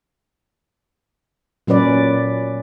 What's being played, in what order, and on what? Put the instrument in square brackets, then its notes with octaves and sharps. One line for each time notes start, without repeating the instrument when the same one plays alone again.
[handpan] A#2 F#3 C#4 B4 D5